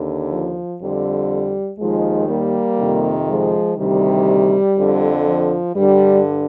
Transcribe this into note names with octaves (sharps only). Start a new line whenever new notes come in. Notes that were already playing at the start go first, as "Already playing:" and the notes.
Already playing: D#2 D3
F3
F2 D3 G3
D#2 D#3 F3 G#3
G3 A#3
F2 C3 D#3
F3 G#3
D2 C3 D#3 G3
F2 D3
F3
G2 D3 G3